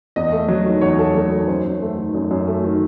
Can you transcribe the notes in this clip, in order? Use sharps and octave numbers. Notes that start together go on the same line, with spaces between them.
E2 D#5
A3
F#3
D#3
E2 C#5
A3 A4
F#3 A4
D#3 A4
F#2 C5
F#2
A3
D#3
F#2
F#2
A3
D#3